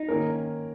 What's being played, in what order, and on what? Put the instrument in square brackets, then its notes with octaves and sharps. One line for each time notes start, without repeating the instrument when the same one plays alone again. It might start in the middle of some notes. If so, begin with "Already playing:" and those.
Already playing: [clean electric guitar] D#4
[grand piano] D#3 A#3 C#4 A#4